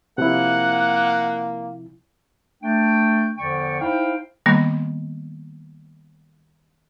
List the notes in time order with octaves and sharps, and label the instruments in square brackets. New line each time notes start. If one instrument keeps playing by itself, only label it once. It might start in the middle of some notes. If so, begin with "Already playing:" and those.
[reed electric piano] C3 F3 E4 [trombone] A#3 [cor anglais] F#5
[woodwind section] A3 D4 G5
E2 D3 F3 D5 G5 C#6
D#4 E4 C5 F5 G5
[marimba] D#3 G3 A#3 B3